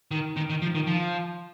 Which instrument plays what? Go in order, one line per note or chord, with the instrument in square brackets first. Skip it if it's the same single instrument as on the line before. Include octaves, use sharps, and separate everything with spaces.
[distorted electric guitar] D#3
D#3
D#3
F3
D#3
F3